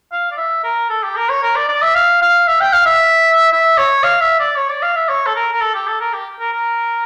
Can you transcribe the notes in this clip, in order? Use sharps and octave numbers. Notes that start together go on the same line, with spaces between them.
F5
D5
E5
A#4
A4
G4
A#4
C#5
A#4
D5
D5
E5
F5
F5
E5
G5
F5
E5
E5
C#5
F5
E5
D5
C#5
D5
F5
E5
C#5
A4
A#4
A#4
A4
G4
A4
A#4
G4
A#4
A#4